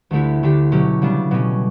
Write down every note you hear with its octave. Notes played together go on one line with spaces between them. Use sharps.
D2 D3 A3 E4 G4
D3 A3 D4 G4
B2 F#3 C#4 G4
C#3 G3 B3 D4
B2 G3 C#4